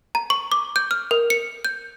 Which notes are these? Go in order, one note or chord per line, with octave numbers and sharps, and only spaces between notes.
A#5
C#6
D6
G6
F6
A#4
C#7
G6